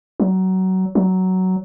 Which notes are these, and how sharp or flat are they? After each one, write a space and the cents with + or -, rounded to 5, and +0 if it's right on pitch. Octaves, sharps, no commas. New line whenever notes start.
F#3 +20
F#3 +10